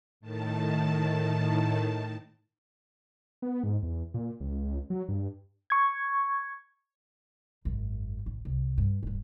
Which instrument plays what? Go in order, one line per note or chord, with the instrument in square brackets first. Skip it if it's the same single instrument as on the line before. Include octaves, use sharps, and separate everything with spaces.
[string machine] A2 D#3 A5
[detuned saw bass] B3
G#2
E2
A#2
C#2
F#3
G2
[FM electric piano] C#6 G#6
[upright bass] G#1 F#2
A1
C2
G2
D1 G2